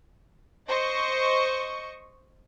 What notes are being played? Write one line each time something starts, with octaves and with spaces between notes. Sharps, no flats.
C5 D#5 C#6